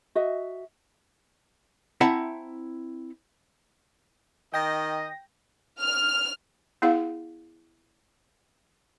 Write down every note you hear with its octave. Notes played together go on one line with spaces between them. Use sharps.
F#4 D#5 E5
C4 E4 E5 F#5 A5 A#5
D#3 D#5 G5 A#6
F6
B3 E4 G#4 F5